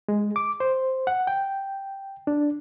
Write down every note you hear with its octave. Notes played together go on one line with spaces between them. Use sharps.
G#3
D6
C5
F#5
G5
D4